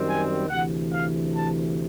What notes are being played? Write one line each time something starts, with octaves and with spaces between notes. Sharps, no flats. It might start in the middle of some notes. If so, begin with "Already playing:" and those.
Already playing: F#2 D#3 G3 C4
G#5
D2 C3 E3 F#5
F5
A5